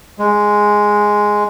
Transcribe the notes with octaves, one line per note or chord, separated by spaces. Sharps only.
G#3